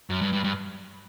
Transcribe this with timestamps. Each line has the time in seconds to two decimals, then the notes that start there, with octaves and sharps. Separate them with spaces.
0.10 F#2
0.21 G2
0.33 G2
0.44 G2